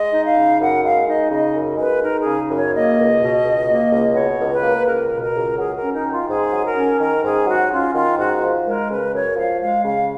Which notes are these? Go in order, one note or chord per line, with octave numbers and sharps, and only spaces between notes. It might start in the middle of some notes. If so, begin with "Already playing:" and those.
Already playing: G#3 D#5
D#4
F5
C#3
F#2 F#5
G#3 F5
D#4 D#5
C#3 D#5
F#2
G#3 B4
D#4 A#4
G#4
C#3
F#2
C#5
A#3 D#5
C#2
B2
C#2
A#3
C#2
B2 C#5
C#2
B4
A#3
C#2 A#4
B2
A#4
C#2
F#3 G#4
A#4
C#4
D#4
D#3 F4
G#2 G#4
F#3
A#4
C#4
D#3 A#4
G#2 G#4
F#3 F#4
C#4 F4
D#3 F4
G#2 F#4
F3
G#3 A#4
C#3 B4
F#2 C#5
F3 F5
G#3 F5
C#3 F5